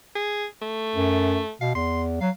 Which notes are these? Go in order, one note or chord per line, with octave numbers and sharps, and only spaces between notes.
G#4
A3
F#2
B2 F5
E2 C6
F#3 F5